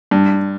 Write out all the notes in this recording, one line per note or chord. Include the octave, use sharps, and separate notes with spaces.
G2